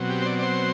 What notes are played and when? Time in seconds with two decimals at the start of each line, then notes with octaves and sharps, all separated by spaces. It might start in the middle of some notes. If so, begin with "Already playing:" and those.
Already playing: B2 F#3 C4
0.09 G4
0.22 C5
0.26 D5
0.39 D5
0.42 C5